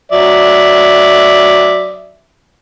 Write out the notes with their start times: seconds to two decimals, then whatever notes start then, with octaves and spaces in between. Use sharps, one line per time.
0.12 F#3 D5 E5